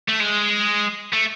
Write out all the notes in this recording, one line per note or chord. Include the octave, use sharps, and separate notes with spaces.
A3
G#3
A3